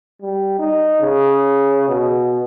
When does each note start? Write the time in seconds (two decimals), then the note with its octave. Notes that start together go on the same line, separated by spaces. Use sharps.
0.21 G3
0.59 D#4
1.01 C#3
1.88 B2